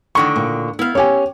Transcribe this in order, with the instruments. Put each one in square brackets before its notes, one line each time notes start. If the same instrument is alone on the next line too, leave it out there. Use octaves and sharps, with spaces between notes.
[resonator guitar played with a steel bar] A2 D3 D#3 [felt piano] C#6
[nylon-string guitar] A#2
[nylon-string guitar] B3 [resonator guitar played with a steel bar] E4 F5
[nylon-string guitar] C#4 G4 [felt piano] C#5 G#5